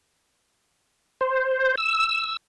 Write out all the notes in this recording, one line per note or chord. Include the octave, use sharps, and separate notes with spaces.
C5
E6